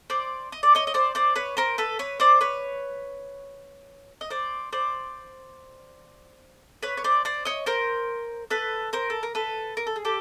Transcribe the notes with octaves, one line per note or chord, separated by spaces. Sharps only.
C5 D5
D#5
D5
C#5 D#5
D#5
C5 D5
C5 D5
B4 C#5
A#4 C5
A4 B4
B4 C#5
C5 D5
B4 C#5
D#5
C5 D5
C5 D5
B4 C#5
C#5
C5 D5
C5 D5
C#5 D#5
A#4 C5
A4 B4
A#4 C5
A4
A#4
A4 B4
A#4
A4
G#4
G4 A4